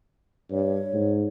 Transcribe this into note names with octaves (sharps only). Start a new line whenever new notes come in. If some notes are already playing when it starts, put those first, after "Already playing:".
G2 C#5
G#2